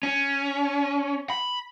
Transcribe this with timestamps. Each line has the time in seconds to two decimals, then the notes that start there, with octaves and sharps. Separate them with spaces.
0.03 C#4
1.30 B5